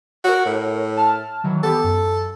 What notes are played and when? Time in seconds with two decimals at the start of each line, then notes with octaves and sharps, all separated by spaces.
0.24 F#4 A#4 C#5
0.45 A2
0.97 A5 F6
1.44 D#3 E3 F#3
1.63 B3 G4 A4
1.84 F#2